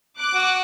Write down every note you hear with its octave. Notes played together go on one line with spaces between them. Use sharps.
D6 F#6
F#4